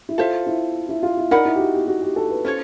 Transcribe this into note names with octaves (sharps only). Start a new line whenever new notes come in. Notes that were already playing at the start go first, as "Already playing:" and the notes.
E4
F4 A4 C5 E5
E4
E4
F4
E4
D#4 A#4 D5 F#5 B5
E4
G4
F#4
G4
F#4
G4
A4
B4
C#4 F4 A4 C5 C#5